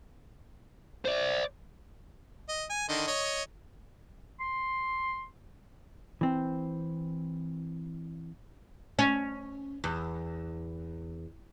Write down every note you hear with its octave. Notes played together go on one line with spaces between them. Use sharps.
C5 D5
D#5
G#5
D3 D#3 D#5
C#5 D#5
C6
E3 C4
C#4
E2